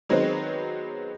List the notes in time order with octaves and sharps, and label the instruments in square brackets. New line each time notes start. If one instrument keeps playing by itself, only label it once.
[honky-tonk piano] D#3 F#3 G#3 B3 C4